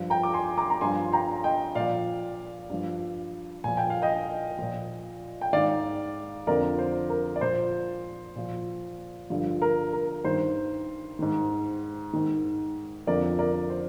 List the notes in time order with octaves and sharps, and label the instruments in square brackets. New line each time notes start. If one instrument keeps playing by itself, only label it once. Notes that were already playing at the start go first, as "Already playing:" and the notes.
Already playing: [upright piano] G2 F3
G5 A#5
D6
G#5 C6
A#5 D6
A#5
G2 F3 G#5 C6
G5 A#5
D#5 G5
A#2 F3 D5 F5
G2 F3
A#2 F3 G#5
G5
F5
D#5 G5
A#2 F3
G5
G#2 D#3 D5 F5
F2 D3 F3 A#4 D5
C5
A#4
D5
A#2 F3 C5
A#2 F3
G2 D3 F3
A#4
A#4
G2 D#3 C5
G#2 D#3
G#2 D#3
F2 D3 F3 A#4 D5
A#4 D5
C5